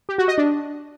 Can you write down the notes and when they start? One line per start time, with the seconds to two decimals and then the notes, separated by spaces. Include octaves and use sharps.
0.09 G4
0.18 F#4
0.28 D#5
0.38 D4